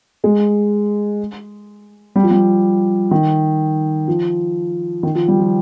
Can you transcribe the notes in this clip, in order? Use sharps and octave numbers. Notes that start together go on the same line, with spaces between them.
G#3
G3
F3
G3
D#3
F3
D#3
F3
G3
F3